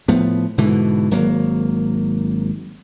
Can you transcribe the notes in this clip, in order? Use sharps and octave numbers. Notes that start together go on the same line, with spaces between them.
A2 F3 B3
G#2 B2 D3 E3
G#1 F#3 A#3